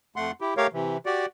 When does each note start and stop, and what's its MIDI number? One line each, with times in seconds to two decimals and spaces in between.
0.16 0.31 41
0.16 0.31 57
0.16 0.31 78
0.16 0.31 84
0.41 0.54 64
0.41 0.54 67
0.57 0.67 57
0.57 0.67 67
0.57 0.67 70
0.57 0.67 73
0.57 0.67 77
0.73 0.97 48
0.73 0.97 52
1.06 1.26 66
1.06 1.26 67
1.06 1.26 74